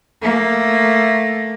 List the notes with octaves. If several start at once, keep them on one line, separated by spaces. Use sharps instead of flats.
A3 A#3